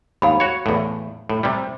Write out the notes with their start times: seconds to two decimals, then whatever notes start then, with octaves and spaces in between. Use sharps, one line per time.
0.22 D#2 G#2 F5 B5
0.40 F#4 C#5
0.66 E2 A2
1.30 A2
1.43 C3 G3